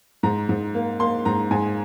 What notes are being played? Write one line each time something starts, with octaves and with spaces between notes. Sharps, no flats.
G#2 A#5
G#2
A#3
A#3 C6
G#2 A#5
G#2 G#5